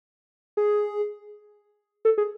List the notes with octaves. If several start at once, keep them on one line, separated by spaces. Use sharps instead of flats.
G#4
A4
G#4